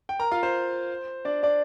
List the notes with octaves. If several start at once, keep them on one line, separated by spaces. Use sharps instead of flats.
G5
A#4 A#5
F4 F5
C5
D4 D5
D4 D5